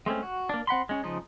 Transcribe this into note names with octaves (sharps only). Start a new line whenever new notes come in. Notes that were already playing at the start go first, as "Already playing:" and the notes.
G#3 A3 C4 C#4
F#4
A#3 D4
C4 F#5 B5 C6
G#3 C#4
C#3 F3 G#3 D#4